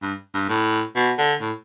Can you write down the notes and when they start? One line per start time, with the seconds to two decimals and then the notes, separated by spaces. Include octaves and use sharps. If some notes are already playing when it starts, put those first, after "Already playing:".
0.03 G2
0.34 G2
0.49 A2
0.96 B2
1.18 D3
1.41 A2